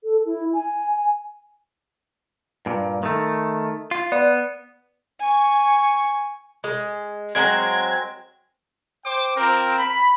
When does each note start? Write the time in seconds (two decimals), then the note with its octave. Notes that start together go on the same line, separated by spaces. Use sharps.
0.04 A4
0.26 E4
0.54 G#5
2.66 G2 A#2
3.03 D#3 A3
3.91 F4
4.12 B3 D5
5.20 G#5 C#6
6.64 G#3
7.35 F#3 G#3 C4 G#6
9.04 C5 G5 D6
9.36 C4 F4 A#4 G5 A#5
9.78 B5